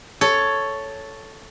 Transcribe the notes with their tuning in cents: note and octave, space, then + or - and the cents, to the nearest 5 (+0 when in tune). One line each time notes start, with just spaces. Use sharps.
A4 +0 C#5 +5